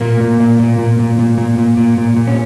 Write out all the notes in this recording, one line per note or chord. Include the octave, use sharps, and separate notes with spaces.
A#2 A#3
A#2
A#2
A#2
A#2
A#2
A#2
A#2
A#2
A#2
A#2
A#2
C#4